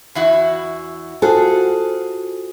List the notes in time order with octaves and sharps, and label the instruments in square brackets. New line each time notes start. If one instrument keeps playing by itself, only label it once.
[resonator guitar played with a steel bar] E2 E4 F#4
[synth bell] F4 F#4 C5 [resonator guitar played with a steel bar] G#4 [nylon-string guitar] A4